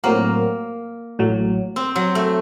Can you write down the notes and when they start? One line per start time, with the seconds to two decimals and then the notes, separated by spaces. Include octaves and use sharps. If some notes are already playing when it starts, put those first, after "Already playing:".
0.04 A2 F#3 A#3 C4 F#4 A#4
1.19 A1 A2 F#3
1.76 C4
1.96 F#3
2.15 A3